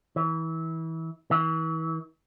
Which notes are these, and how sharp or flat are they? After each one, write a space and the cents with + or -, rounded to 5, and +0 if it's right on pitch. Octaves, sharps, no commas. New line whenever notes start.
E3 -25
E3 -35